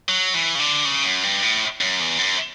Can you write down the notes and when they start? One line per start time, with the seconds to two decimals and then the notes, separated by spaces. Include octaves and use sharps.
0.09 F#3
0.34 E3
0.55 C#3
0.59 D3
0.85 C#3
1.04 F#2
1.23 G2
1.42 A2
1.81 F#2
2.00 E2
2.19 F#2